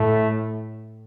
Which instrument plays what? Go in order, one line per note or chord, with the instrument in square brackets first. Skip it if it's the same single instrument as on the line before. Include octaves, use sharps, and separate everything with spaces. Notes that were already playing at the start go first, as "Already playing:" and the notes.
Already playing: [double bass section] A2 [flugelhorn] A3